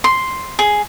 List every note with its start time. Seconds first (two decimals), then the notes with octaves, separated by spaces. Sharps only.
0.04 C6
0.59 G#4